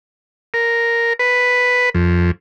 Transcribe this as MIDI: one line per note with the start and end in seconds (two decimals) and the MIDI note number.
0.54 1.13 70
1.19 1.90 71
1.95 2.31 41